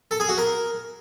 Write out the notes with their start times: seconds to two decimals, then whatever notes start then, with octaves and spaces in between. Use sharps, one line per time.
0.11 A4
0.20 G#4
0.29 F#4
0.38 A#4